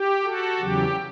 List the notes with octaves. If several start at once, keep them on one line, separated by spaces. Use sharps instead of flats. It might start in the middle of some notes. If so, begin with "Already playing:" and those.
Already playing: G4
F#4 A4
E2 C#3 F#3 G4